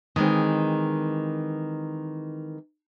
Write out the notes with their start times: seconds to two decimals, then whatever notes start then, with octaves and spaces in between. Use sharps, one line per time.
0.16 D#3 E3 G#3 C4